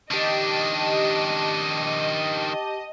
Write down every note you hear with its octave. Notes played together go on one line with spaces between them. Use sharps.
D#3 D4 G4 D#5 A5